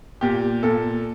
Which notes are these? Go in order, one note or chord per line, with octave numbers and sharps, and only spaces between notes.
A#2 G4
A#2 A4